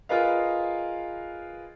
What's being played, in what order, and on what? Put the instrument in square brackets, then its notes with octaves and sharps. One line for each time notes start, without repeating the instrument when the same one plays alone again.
[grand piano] F4 G#4 A#4 B4 D#5 F5